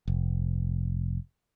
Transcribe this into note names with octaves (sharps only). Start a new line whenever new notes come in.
F1